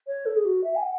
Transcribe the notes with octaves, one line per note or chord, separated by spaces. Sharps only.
C#5
A4
G#4
F#4
E5
G#5
F#5